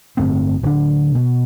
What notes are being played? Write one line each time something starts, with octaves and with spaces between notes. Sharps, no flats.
G1 A2 A3 C4
D1 D3 D4
B2